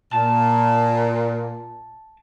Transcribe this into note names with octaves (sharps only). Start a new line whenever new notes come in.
A#2 A5